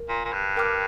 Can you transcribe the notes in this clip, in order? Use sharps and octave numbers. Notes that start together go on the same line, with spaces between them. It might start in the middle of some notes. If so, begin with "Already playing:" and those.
Already playing: A#4
A#2
A#2
G2
A#4 G5 D6 F6